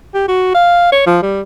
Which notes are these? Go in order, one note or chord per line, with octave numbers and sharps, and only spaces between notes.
G4
F#4
F5
C#5
F3
G3